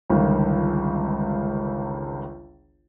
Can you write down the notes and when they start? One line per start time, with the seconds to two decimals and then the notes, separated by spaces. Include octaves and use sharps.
0.10 G1 C#2 D#3